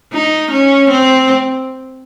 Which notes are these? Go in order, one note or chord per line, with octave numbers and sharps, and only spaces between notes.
D#4
C#4
C4